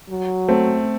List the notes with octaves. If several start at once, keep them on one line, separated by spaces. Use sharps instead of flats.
F#3
A3 C4